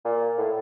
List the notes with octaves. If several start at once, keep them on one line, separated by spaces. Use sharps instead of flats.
A#2
A2